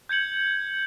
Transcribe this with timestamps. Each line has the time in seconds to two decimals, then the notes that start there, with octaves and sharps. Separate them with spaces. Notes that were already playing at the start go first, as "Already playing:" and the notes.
0.09 G6 G#6 C#7 F#7